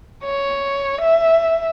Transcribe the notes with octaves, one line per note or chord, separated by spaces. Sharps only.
C#5
E5